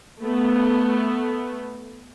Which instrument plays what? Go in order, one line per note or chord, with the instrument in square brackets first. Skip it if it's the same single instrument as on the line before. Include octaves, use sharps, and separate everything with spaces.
[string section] A3 B3